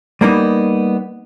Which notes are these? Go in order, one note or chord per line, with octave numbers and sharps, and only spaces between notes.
G3 A#3 B3 D#4